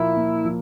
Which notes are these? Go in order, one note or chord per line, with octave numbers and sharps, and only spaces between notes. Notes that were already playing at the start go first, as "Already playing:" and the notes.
Already playing: A#2 F3 A#3 E4
A#2
F3